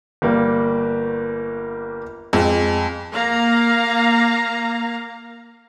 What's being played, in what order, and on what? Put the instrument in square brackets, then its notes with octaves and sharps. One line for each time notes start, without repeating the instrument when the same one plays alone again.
[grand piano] G1 G3 A#3
[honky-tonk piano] F2 G#3
[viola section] A#3 F5 A#5